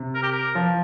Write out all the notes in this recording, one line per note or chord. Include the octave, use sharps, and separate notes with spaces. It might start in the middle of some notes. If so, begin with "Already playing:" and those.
Already playing: C3
A#4
G4
A#4
F3